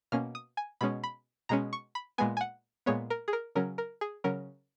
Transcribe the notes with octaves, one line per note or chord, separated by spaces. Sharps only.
B2 A#3 C#4 F6
D#6
G#5
B2 G#3 C#4 B5
B5
B2 G#3 C#4 A#5
C#6
B5
A#2 G#3 B3 G#5
G#5
F#5
A#2 G#3 B3 C#5
A#4
G#4
A#4
C#3 F#3 C#4 A#4
A#4
G#4
C#3 F#3 C#4 A#4